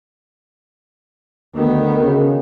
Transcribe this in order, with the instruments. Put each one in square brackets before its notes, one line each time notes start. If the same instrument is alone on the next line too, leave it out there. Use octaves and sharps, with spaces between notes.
[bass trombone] D2 [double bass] D#3 B3
[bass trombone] C#3